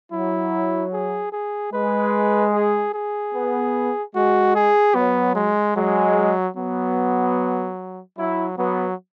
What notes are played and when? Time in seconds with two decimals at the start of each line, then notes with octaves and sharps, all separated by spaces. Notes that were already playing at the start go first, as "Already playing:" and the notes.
0.12 F#3 E4
0.93 G#4
1.32 G#4
1.73 G#3 B4
2.53 G#4
2.94 G#4
3.34 B3
4.15 G#3 F#4
4.55 G#4
4.95 F#3 B3
5.35 G#3
5.76 F#3 G#3
6.56 F#3 B3
8.18 F#3 E4
8.58 F#3 B3